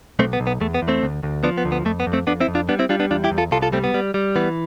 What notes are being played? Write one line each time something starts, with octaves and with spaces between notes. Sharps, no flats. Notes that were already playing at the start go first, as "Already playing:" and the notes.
B1 A3 C4
B3
B1
B3
E2 A3
B3
E2
A3 C4
D2
D2
F3 B3 D4
B3
D2
B3
F2 A3
B3
F2
A3 C4
F2 B3 D4
C4 E4
F2
D4 F4
G3 B3 D4
C4 E4
G3 D4 F4
B3 D4
E2 D4 F4
E4 G4
E2
F4 A4
C2 F4 A4
F4 A4
G3 A3 C4
B3
G3
G3
E3 B3